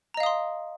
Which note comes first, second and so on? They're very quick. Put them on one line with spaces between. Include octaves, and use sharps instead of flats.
A#5 D#5 F5 D#6 C6